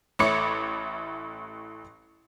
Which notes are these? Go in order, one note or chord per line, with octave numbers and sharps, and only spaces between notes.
A1 A3 C#5 B5 D6 C#7